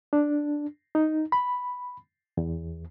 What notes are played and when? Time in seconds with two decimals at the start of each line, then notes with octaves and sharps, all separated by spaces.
0.13 D4
0.95 D#4
1.32 B5
2.37 E2